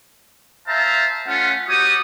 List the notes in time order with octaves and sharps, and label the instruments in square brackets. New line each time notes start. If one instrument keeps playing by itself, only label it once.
[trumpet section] C5 E5 F5 A5 A#5
A3 C#4 F4 F#5
G3 F#4 G4 C#5 D#6